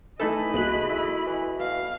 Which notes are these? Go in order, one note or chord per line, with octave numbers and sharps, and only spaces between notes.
E3 A3 D#4 A4 D#5 B5
C2 G#3 A#3 F#4 A4 F#6
E4
E3
B2 F5